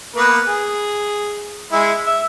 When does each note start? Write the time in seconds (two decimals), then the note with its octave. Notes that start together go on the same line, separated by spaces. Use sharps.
0.16 A#3 B3 B4
0.47 G#4
1.72 G#3 E4
2.06 E5